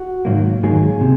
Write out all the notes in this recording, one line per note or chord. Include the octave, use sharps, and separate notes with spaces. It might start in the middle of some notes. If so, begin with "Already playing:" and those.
Already playing: F#4
G#2 D#3 F#3 A#3
G#2 D#3 F#3 A#3 G#4
C3